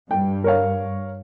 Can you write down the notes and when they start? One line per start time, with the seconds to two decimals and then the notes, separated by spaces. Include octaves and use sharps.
0.11 G2 G5
0.44 A#4 C#5 F5